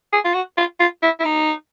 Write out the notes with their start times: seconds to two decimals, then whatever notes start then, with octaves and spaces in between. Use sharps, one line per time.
0.13 G#4
0.25 F4
0.34 F#4
0.57 F4
0.80 F4
1.03 E4
1.20 E4
1.25 D#4